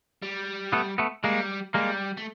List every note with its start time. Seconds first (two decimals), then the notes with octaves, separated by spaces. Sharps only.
0.23 G3
0.73 A3 B3
0.98 A3 B3
1.24 G3 G#3 A#3
1.74 G3 G#3 A#3
2.17 A3